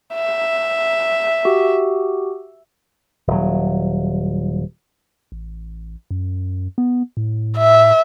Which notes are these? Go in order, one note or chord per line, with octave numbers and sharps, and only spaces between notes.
E5
F#4 G4
D#1 F#3
A1
F#2
B3
A2
E5